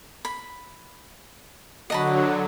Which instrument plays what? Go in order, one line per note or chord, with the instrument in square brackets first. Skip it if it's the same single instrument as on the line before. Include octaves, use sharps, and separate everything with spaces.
[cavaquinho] B5
[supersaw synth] D3 F#3 [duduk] F#4 [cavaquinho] D#5 A5 B5